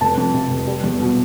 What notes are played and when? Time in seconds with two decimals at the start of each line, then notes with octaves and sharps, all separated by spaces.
0.01 F1 A5
0.17 F2
0.34 C3
0.50 F1
0.67 G3
0.83 E2
1.00 B2